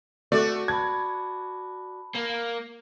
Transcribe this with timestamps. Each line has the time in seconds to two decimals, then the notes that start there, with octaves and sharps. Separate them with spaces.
0.32 A3 F#4 D5
0.68 A5 B5 G#6
2.15 A#3